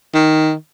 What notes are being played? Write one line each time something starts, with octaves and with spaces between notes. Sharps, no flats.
D#3